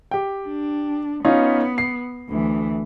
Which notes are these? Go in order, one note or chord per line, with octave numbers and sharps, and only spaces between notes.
G4 G5
D4
B3 C#4 D#4 F4
C7
D2 E3